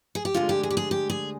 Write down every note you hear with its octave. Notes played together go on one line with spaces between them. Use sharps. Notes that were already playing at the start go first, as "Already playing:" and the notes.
G#4
G4
D2 D3 G#3 F4
G4
G#4
G4
G#4
G4
G#4